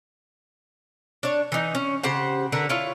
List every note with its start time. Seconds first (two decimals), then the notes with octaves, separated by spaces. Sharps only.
1.23 D4 C#5
1.52 E3 D#4
1.75 C#4
2.03 C#3 G4 C5 F#5
2.52 D3 A#4 B4 F#5
2.69 E4 F4 C#5